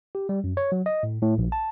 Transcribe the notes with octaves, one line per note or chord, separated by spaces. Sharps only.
G4
G3
F#2
C#5
F#3
D#5
A2
A2
A#1
A5